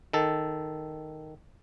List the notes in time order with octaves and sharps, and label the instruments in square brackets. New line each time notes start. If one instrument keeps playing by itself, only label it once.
[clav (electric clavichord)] D#3 A4